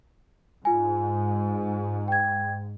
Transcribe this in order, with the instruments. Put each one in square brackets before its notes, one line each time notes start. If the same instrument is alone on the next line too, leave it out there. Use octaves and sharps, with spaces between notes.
[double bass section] G#2 [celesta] F4 G#5
[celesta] G5 G#6